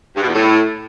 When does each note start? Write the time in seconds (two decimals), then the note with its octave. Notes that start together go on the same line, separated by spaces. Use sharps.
0.16 G2
0.22 B2
0.28 E2
0.34 A2